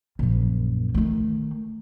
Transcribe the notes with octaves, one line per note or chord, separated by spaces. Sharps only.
A#1 F#2
D#3 A3